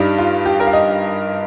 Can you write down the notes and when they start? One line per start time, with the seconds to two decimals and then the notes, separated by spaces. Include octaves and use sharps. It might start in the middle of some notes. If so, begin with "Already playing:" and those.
Already playing: G2 G3 D#4
0.18 F4
0.46 G4
0.60 A#4
0.67 F5
0.73 D#5